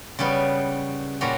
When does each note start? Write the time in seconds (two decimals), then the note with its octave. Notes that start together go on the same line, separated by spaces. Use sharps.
0.19 C#3 G3 B3
1.21 A#2 G3 C#4 F#4